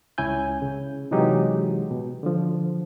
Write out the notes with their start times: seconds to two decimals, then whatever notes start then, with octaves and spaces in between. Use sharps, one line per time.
0.18 C#2 C#4 E4 G#5 G6
0.62 C#3
1.11 C3 E3 F#3 G#3 D#4 G4
1.91 B2
2.23 D3 F3